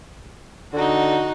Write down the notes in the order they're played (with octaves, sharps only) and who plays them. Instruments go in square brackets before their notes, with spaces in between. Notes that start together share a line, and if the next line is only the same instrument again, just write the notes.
[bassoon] D3 [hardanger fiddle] D#4 F#4